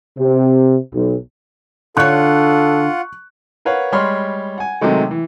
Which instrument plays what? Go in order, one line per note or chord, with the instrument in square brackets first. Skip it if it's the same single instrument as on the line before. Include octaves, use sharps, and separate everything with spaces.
[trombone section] C3
B1
[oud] D3 C#5 [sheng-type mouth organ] F4 F#5 [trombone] A4 [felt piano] C#6 F#6
[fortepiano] A#4 B4 C#5 F5 F#5
G3 G#3 C#5 B5 C6 F6
F#5 G#5
C3 D#3 F#3 G#3 A3
E3